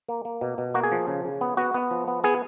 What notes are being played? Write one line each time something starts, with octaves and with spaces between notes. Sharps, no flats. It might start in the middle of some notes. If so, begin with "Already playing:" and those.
A#3
A#3
B2
B2
A#3 F#4
G#4
F3
C#3
C#3
B3
B3 F#4
B3
F3
B3
B3 G#4